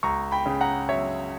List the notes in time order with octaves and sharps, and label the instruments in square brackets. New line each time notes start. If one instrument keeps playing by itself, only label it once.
[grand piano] C#2 A#5 C#6
G5 B5
C#3
F#5 A#5
F#3 C#5 E5